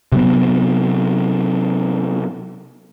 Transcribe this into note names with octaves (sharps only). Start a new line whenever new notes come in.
C3 F#3 B3